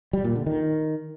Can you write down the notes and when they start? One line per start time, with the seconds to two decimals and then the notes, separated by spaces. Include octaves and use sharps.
0.13 G3
0.24 A#2
0.35 D3
0.46 D#3